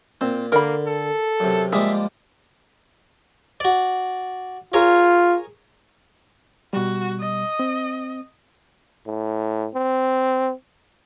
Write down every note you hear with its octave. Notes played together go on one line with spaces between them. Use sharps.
A#2 C4
D3 A#3 A#4 B5
A4
F#2 C3
F3 G3 G#3 A#3 G#4 E5
F#4 D5
F4 G#4 A#4 C#5
B2 G3 F#4
D#5
C4
A2
C4